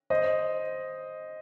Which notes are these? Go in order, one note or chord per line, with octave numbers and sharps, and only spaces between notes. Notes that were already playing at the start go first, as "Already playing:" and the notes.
C5 D#5